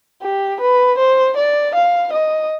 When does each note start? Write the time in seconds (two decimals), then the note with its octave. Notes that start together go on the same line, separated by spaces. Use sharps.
0.22 G4
0.61 B4
0.98 C5
1.37 D5
1.75 F5
2.13 D#5